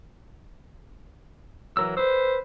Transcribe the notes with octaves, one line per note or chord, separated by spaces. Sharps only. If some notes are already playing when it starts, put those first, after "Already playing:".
E3 F#3 A#4 E6
B4 C5 E6